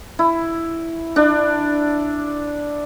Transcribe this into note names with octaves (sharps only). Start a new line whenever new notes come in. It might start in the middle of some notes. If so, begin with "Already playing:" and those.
E4
D4